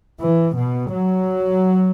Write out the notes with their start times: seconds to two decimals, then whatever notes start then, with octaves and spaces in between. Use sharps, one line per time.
0.20 E3
0.55 B2
0.91 F#3